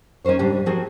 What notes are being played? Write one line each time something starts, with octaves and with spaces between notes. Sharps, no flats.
C#4 D#4 A#4 C5 C#5
G#2 C#3 G3 C#4 D4 G4
F3 C4 F#4 G#4 A#4